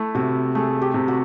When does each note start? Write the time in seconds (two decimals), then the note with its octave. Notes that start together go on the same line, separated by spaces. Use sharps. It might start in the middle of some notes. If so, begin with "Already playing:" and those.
Already playing: A3 E4
0.15 C3 F#4
0.55 A3 G#4
0.82 G4
0.94 C3
1.08 F#4